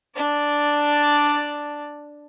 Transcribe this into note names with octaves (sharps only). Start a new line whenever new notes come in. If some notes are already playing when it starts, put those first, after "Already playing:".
D4 D5